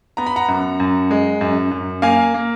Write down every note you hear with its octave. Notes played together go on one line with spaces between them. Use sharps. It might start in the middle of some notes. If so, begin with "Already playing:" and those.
B3 A#5
B5
F#5 A#5
F#2
F#2
G#3
F#2
F#2
A#3 F5 G#5
A#3